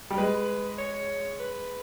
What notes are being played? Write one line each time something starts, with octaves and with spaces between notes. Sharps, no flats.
G3
G#3 B4
C#5
B4